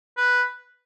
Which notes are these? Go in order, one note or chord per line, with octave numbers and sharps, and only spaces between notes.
B4